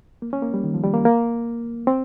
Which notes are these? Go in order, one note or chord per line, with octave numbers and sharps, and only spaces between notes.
A#3
C#4
A#3
G3
D#3
F3
G3
A#3
A#3
C4